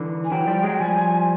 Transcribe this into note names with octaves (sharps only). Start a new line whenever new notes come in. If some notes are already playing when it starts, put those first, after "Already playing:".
Already playing: D3 E3
G#5
E3 F#3 G5
F3 G3
F#3 G#3
F3 G3 G#5